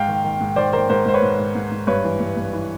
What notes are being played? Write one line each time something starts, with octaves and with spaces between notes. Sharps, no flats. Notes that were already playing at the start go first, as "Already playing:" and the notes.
Already playing: G#2 F5 G5
D#3
D#3
G#2
D#3 C5 D5
D#3 A#4 C5
G#2 A#4 C5
G#2 C5
B4 C#5
G#2
G#2
G#2
G#2
G2 B4 C#5
E3
G2
G2
E3